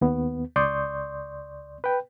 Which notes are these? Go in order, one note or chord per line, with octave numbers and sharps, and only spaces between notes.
D#2 B3
C#2 D5 C6 C#6 D#6 G6
B4 G5